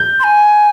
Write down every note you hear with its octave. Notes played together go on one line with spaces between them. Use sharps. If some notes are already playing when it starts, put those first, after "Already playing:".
Already playing: G6
C6
G#5